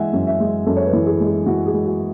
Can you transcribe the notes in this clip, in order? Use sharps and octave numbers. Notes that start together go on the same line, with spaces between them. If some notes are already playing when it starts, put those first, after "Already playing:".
Already playing: E3 G#3 E5 F#5 G#5
F#2
E5
G#3
F#2 A4
C#5
B4
E3
G#4
G#3
G#4
E3 F#4
G#4
G#3
F#4